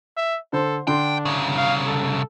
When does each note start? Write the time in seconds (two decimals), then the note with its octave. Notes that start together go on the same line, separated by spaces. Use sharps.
0.17 E5
0.53 D3 A4 C5 C6
0.87 D3 D4 G5 C6
1.25 C2 C#3
1.57 F5
1.87 A4